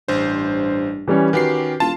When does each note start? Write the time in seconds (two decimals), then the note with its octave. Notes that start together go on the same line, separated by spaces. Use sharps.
0.08 A1 G2 C5
1.08 E3 G3 C#4
1.33 D#3 C#4 F#4 G4 B4 C7
1.80 E1 F4 A5